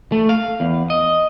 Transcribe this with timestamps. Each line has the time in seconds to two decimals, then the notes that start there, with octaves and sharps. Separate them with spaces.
0.12 A3
0.29 F5
0.60 E2
0.90 D#5